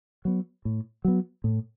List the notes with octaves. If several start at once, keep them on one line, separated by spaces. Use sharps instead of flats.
F#3 B3
A2
F#3 B3
A2